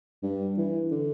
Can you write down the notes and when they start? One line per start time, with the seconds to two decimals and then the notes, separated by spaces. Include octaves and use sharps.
0.23 G2
0.58 E3
0.91 D3